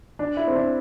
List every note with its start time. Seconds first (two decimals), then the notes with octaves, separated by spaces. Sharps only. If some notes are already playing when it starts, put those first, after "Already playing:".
0.19 D4
0.37 E4
0.47 C4
0.55 D4